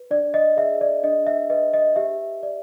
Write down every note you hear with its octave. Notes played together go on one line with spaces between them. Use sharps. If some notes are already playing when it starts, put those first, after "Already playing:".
Already playing: B4
D4 D5
D#5
G#4 E5
D5
D4 D#5
E5
B4 D#5
D#5
G4 E5
D5